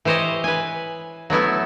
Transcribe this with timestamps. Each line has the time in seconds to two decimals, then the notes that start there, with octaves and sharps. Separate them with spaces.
0.05 E3 G4 C5 C#5 D#5
0.44 B4 G#5
1.30 F#3 A3 B3 E4